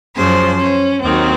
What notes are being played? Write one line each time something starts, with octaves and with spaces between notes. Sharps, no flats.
F#2 C#3 F3 C5
C#4
D#2 D#3 F#3 C4